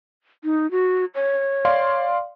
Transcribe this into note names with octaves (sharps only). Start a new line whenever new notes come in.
D#4
F#4
C#5
D5 F5 C6